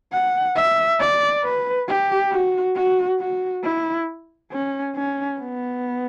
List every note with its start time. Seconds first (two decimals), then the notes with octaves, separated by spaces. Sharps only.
0.12 F#5
0.55 E5
1.00 D5
1.43 B4
1.88 G4
2.31 F#4
2.76 F#4
3.20 F#4
3.64 E4
4.52 C#4
4.95 C#4
5.39 B3